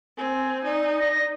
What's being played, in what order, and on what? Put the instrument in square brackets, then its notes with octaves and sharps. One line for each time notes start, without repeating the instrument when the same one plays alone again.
[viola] C4 [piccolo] G#5
[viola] D#4 [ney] D5
[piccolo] A#6